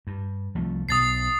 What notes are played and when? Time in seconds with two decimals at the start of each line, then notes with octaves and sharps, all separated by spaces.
0.07 G2
0.55 C2 F3 A3
0.89 B1 B2 D#6 A6 C7